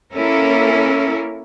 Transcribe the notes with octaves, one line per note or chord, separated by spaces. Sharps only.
A#3 C#4 E4 A4 A#4